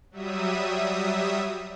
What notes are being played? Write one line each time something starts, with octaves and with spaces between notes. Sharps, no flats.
F#3 G3 E5 D#6